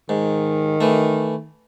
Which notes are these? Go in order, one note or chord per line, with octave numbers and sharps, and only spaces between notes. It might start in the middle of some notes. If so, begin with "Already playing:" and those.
G#2 D#3
E3 A3